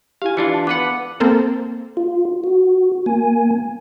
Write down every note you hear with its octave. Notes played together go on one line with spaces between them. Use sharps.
E4 G4 F5 G#5
E3 D4 F4 C#7
A5
B3 B4 F#5 D6 C#7
A#3 C4 A4 A#4
F4
F#4
A#3 G#5